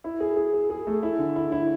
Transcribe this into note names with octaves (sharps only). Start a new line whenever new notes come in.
E4
G#4
G#4
G#4
G#4
A3
E4
D3
E4
E4